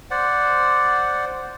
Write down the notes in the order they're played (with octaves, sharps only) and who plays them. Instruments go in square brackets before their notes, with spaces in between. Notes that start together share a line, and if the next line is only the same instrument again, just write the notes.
[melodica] C5 D5 F#5